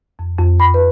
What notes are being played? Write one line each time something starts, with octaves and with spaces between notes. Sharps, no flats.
F2
F2
B5
B4